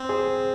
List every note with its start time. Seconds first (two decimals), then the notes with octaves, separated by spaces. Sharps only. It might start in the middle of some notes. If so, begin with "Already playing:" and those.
Already playing: C4
0.09 G#4 C5